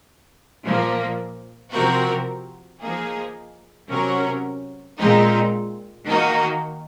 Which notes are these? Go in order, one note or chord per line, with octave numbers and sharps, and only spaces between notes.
A#2 F3 A#3
C3 F3 C4 F#4 A#4
F3 A#3 D#4 G#4
C3 F#3 C#4 F#4 A#4
A#2 G#3 C4 D#4
D#3 A#3 D#4 F#4